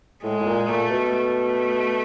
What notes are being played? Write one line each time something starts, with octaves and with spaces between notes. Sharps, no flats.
A2 G#3
A2
A#2
A#2 A3
B2
A3